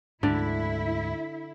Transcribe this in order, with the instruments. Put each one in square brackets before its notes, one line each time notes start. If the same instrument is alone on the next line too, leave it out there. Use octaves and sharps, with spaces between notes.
[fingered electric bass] D2 G#2 [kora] D3 D5 [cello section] E4